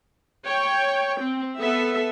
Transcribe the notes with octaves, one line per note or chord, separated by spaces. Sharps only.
C#5 G5
C4
B3 A4 E5